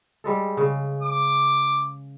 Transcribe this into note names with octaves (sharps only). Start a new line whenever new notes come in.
G3 G#3 A4
C#3
D6